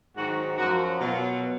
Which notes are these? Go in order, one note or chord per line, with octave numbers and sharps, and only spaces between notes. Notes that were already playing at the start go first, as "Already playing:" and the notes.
G#2 D#3 F#3 F#4
F#2 F3 F#4
B2 F#3 F4